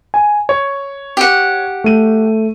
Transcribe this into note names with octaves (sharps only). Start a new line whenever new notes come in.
G#5
C#5
G4 F#5
A3 D#7